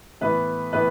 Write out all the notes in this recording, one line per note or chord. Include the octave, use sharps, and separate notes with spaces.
A2 E3 B3 B4
A2 E3 B3 B4